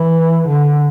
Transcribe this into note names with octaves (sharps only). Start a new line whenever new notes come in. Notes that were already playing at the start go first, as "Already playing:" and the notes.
Already playing: E3
D3